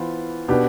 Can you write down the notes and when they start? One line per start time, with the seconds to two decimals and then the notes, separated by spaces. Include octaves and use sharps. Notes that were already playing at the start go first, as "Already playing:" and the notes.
Already playing: E3 B3 F4 C5
0.48 B2 B3 D4 G4 B4